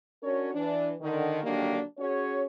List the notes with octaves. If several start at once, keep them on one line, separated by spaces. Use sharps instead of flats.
C#4 D4 F#4 A#4 C#5
E3 D4
D3 D#3
D3 D#3 F#3 G3 A#3 D4
C#4 F#4 G#4 C#5